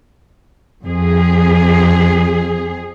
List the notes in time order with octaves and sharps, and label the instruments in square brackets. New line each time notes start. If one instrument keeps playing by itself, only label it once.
[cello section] F2 G#4